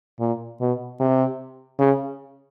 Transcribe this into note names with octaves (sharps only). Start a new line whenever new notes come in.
A#2
B2
C3
C#3